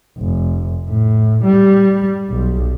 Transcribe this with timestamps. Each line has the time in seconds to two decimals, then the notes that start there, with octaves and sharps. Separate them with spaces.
0.18 F1
0.88 A2
1.44 G3
2.29 B1